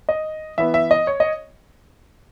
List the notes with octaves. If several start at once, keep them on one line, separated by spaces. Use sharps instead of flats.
D#5
E3 B3 E5
E5
D#5
C#5
D#5